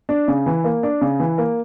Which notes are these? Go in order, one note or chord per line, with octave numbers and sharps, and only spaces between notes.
D4
C#3
E3
A#3
D4
C#3
E3
A#3